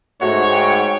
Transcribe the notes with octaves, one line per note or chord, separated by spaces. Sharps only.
G#2 A3 F#4 C#5 F#5
G5